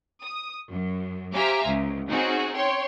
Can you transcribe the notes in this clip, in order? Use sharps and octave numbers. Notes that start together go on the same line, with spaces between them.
D#6
F#2
G4 C5 E5 F5 G#5 A#5
C#2
C4 C#4 D#4 F#4 G#4
C#5 G5 C6